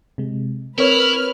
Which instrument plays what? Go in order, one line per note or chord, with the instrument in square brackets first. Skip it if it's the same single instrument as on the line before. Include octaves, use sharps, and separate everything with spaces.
[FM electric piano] C3 G#3
[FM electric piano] C4 C#5 [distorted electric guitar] E4 [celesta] A#4 [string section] B4 F6